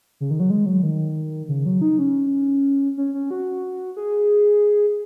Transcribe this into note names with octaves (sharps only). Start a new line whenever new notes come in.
C#3
D#3
F#3
G#3
F#3
D#3
C#3
F#3
D#4
C#4
C#4
C#4
F#4
G#4